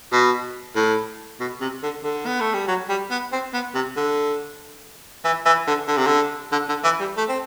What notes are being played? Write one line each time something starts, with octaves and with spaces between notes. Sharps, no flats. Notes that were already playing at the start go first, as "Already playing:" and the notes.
B2
A2
B2
C3
D3
D3
B3
A3
G3
F#3
G3
B3
C4
B3
C3
D3
E3
E3
D3
D3
C3
D3
D3
D3
E3
G3
A3
C4